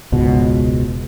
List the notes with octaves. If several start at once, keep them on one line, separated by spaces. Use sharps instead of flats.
E1 C#2 G#2 B2